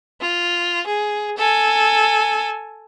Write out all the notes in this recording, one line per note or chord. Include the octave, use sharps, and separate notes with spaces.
F4
G#4
A4 G#5